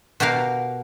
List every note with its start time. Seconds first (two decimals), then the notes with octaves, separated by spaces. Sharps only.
0.20 B2 F#4 G4 A#4 F5